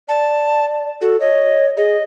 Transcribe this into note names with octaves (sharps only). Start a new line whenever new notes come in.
D5 A5
F#4 A4
C#5 D#5
G#4 D#5